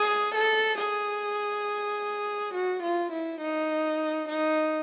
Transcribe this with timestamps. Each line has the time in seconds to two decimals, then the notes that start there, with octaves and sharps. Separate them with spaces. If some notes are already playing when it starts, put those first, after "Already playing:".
Already playing: G#4
0.35 A4
0.78 G#4
2.54 F#4
2.83 F4
3.12 E4
3.41 D#4
4.29 D#4